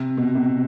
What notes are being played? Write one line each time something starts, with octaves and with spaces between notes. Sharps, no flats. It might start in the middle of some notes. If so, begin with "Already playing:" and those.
Already playing: C3
B2
C3